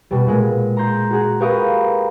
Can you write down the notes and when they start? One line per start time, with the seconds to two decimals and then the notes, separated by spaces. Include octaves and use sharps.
0.11 B2 G3
0.27 A#2 G#3
0.77 A#5 C6 G6
1.11 F#4 G#4
1.40 G4 A#4 B4 F5 C#6 D#6